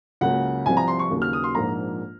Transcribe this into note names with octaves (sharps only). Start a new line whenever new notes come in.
C#2 C#3 F#3 A#3 F#5
C2 C3 F3 G#5
A#5
C6
C#6
D#2 C#3 F#3 A#3
F6
D#6
C6
A#1 G#2 F3 A#3 A#5